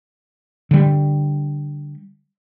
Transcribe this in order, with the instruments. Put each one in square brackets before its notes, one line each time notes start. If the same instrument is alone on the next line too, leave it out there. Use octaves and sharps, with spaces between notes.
[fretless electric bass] D3 G3